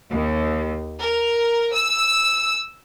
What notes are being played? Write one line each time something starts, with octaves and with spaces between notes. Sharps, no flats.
D#2
A#4
E6